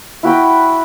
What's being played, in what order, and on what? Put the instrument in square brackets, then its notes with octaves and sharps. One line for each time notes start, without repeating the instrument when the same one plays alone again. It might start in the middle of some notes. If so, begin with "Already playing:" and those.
[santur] E4 F#4 G5 B5